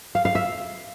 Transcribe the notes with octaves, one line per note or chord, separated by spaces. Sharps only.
F5
F5
E5